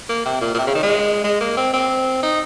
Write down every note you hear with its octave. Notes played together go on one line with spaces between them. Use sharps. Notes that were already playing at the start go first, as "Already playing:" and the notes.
A#3
C3
A#2
A#2
C3
C#3
D#3
G#3
G#3
A#3
C4
C4
D#4